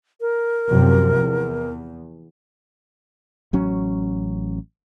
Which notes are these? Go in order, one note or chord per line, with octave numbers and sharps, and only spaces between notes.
A#4
F#2 C3 F3
E2
A1 F#3 C#4